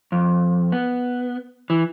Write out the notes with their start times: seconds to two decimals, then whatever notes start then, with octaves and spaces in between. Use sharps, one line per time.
0.12 F2
0.72 B3
1.70 E3